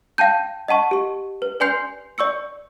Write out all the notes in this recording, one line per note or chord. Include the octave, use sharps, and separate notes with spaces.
F5 G5 A5 G6
D#5 F#5 A5 C#6
G4 C#6
B4
B4 D5 G#5 C6 G6 C7
D5 C#6 E6 C#7